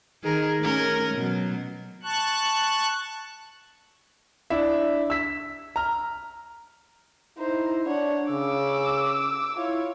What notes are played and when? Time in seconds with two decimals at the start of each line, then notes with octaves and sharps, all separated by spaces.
0.24 D#3 G#4 A#4
0.60 A3 C#4 A#4
1.14 B2 F#3
2.03 A5 C#6 F#6
4.50 D4 E4 E5
5.10 E6 B6
5.76 A#5 F6
7.38 D#4 E4 C5
7.86 D4 C#5 F#5
8.30 C#3 D6 E6
9.58 E4 F4 C#5